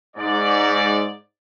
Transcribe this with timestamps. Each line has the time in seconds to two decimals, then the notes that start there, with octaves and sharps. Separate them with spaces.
0.17 G#2 D5